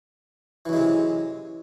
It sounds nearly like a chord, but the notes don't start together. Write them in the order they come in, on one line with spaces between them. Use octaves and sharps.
E3 F#2 G#3 C3